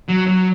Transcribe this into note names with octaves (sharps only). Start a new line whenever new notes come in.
F#3
F#3